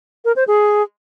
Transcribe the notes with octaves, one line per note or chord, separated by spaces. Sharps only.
A#4
C5
G#4